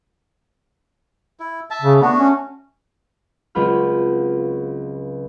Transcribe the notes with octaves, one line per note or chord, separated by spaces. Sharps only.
E4
E5 A5
C#3
A3 B3 D4 F#4
C#4
C#2 F#3 C4 F4 B5 F6